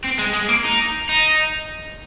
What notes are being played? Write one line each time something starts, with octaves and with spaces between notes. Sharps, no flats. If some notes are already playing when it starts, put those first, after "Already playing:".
C4
G#3
G#3
A#3
D#4
D#4